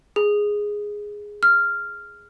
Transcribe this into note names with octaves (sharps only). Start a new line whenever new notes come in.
G#4
F6